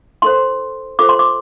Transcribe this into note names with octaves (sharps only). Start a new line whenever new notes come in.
E4 A4 C5 C6
F4 A4 C5 D6
C6
D6